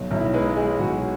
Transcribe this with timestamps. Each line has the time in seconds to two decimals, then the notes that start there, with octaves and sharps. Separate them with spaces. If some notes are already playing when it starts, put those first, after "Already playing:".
Already playing: B1
0.11 B1 E4
0.34 G#3 B4
0.56 G#3 G#4
0.79 B1 F#4